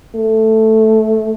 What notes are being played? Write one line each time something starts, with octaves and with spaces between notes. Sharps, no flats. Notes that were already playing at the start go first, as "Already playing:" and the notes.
A3